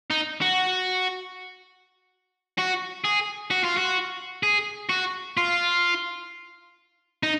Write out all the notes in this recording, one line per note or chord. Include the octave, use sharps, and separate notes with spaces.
D#4
F#4
F#4
G#4
F#4
F4
F#4
G#4
F#4
F4
D#4